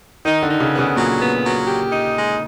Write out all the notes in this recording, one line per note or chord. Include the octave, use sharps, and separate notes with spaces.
D#3 D#4
D3
D#4
C#3
B3
C#3
A#2 F#3
B3
F#3
G4
D#4
G#3